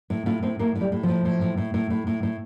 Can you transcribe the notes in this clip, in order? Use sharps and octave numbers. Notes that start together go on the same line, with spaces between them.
A2
A2 F4
A2 C4
A2 A#3
A2
G3
A2
F3
A2
A2
A2
A2
A2
A2
A2
A2